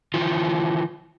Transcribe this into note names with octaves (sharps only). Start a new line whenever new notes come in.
D#3 E3 F4